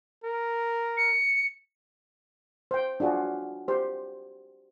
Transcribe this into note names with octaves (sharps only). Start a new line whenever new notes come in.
A#4
C#7
C5 G5
D4 F4 F#4 G#4
G4 C5